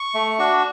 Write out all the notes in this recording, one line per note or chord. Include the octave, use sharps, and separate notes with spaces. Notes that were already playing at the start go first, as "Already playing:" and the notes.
Already playing: C#6
A3
D4 F#4